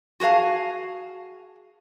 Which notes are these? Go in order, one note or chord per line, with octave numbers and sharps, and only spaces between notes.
F#4 G#4 A#4 F5 A5